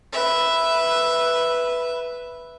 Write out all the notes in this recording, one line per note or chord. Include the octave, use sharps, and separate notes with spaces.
B4 E5